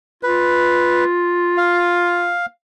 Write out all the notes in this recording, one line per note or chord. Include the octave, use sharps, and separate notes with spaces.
F4 B4
F5